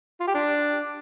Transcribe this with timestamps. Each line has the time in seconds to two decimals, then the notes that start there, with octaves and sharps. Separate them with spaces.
0.20 F4
0.27 G4
0.34 D4